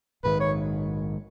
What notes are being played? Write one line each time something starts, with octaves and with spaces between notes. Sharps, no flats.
A#1 G#2 D#3 B4
C#5